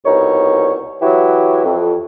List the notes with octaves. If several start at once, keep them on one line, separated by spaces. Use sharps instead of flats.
C2 B2 D#4 C#5
E3 F#3 E4 F#4 G4
F2